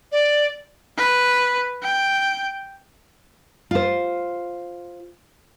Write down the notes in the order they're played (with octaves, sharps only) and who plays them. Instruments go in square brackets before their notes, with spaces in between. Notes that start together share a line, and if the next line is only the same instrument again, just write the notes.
[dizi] D5
[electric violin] B4
G5
[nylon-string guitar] F4 C5